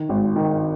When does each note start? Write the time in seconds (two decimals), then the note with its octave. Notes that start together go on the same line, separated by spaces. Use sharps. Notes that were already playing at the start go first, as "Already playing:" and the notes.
Already playing: D#3
0.09 G#1
0.36 D#3